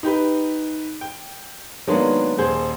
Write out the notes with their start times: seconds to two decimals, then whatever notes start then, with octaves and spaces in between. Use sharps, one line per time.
0.03 D#4 G4 B4
1.01 G5
1.87 D#3 F#3 G#3 A#3 B3 D4
2.38 D#1 G#4 C5 G6